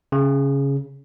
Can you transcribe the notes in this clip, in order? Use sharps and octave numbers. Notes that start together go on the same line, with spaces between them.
C#3